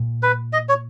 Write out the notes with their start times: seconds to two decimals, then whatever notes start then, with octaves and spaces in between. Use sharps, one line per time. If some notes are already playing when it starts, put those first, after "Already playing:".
Already playing: A#2
0.23 B4
0.53 D#5
0.69 C#5